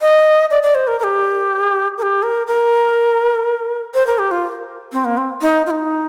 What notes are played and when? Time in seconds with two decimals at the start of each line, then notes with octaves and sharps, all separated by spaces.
0.01 D#5
0.51 D5
0.63 D5
0.75 C5
0.87 A#4
1.00 A#4
1.04 G4
1.98 A#4
2.02 G4
2.23 A#4
2.47 A#4
3.94 C5
4.07 A#4
4.19 G4
4.31 F4
4.93 C4
5.05 A#3
5.17 C4
5.42 D#4
5.66 F4
5.71 D#4